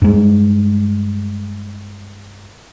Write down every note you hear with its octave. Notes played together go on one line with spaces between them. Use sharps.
G2 G#3